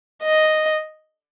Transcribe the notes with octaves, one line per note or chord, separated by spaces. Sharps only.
D#5